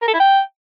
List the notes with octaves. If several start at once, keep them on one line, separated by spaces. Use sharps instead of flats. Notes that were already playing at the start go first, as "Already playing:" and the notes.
A#4
A4
E4
G5